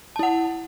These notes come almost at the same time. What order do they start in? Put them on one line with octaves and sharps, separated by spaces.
A5 E4 F#5